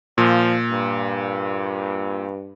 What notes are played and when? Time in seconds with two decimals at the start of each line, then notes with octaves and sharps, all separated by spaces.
0.18 A#2 F3
0.71 G2